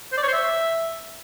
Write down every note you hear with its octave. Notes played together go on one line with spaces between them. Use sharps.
C5
D5
C#5
C5
E5